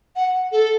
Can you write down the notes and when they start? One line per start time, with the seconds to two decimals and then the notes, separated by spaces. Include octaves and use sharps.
0.16 F#5
0.52 A4